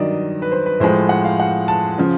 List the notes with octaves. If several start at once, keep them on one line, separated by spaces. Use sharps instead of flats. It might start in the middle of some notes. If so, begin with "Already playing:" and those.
Already playing: G2 D#3 F#3 D5 D#5
B4
C5
B4
A2 F3 G#3 C5
F#5
F5
F#5
A5
C#3 F3